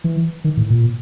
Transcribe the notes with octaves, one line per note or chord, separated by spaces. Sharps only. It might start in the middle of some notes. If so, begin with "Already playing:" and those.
E3
D#3
A2
A#2